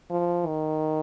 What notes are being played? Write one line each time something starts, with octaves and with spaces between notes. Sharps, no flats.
F3
D#3